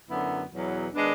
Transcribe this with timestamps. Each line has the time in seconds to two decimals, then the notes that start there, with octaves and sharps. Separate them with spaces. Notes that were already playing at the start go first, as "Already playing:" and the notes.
0.08 F#2 D3 F#3 B3 E4
0.51 E2 B2 F#3
0.94 D#3 G#3 B3 D4